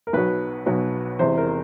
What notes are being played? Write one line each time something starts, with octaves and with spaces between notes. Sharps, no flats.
A#4
B1 B2 F#3 B4
B1 B2 F#3
E1 E2 C3 C5
A#4